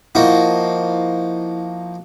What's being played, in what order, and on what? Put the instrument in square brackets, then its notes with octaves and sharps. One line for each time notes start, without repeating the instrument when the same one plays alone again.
[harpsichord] F3 A#3 D#4 F#4 [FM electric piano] E4